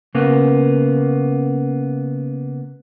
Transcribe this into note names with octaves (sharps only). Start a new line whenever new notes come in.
C#3 A#3 B3